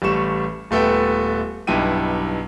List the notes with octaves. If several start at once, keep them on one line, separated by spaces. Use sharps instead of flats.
A1 G3 A3 C#6 E7
D#1 A3 B3 A4 G5
B1 G2 D#4 E4 G5 D#7